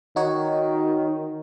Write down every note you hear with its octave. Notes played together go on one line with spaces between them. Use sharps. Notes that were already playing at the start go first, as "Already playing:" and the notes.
D#3 D#4 F#4 C#5